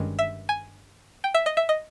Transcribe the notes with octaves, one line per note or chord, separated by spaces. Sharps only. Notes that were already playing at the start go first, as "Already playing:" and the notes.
Already playing: G1 G2 D#3 G#3 C#4
E5
G#5
G5
E5
D#5
E5
D#5